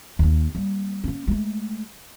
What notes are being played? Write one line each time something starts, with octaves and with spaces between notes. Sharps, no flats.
D#2 A#3
G3 A#3
A#3 C#4
G#3 A3